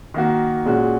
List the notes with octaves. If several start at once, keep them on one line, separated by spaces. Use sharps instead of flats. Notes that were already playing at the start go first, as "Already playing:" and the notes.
D#3 A#3 F#4
A#2 G#3 C#4 F#4